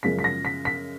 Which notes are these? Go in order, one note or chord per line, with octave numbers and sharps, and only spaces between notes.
F#2 C#3 F3 G#3 B6
B6
A#6
B6
B6